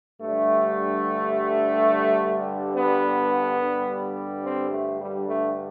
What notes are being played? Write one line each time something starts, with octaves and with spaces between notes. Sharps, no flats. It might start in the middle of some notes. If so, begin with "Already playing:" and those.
G2 D3 G3 A3
B3
G2 D3 G3
C4
A3
G3
A3